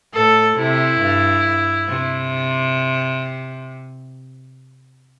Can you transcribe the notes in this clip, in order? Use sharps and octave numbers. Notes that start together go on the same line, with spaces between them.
A2 A4
C3 E4
G2
C3